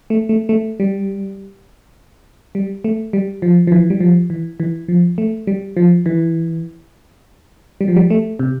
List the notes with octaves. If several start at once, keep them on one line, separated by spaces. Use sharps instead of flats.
A3
A3
A3
G3
G3
A3
G3
F3
F3
E3
G3
F3
E3
E3
F3
A3
G3
F3
E3
G3
F3
G3
A3
C3